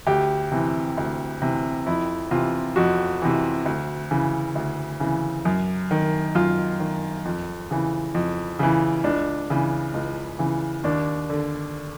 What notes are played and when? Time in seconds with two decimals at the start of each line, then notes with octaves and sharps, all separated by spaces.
0.07 D2 G4
0.51 C3 E3
0.97 D2
1.42 C3 E3
1.86 F2 E4
2.31 C3 E3 F4
2.76 F2 F#4
3.22 C3 E3
3.66 D2
4.11 C#3 E3
4.55 D2
5.00 C#3 E3
5.45 F#2
5.91 D#3
6.35 F#2 F4
6.80 D#3
7.25 F2
7.71 C#3 E3
8.14 F2
8.59 C#3 E3
9.04 C#2 D4
9.50 C#3 E3
9.94 C#2
10.39 C#3 E3
10.84 D#2 D4
11.29 D3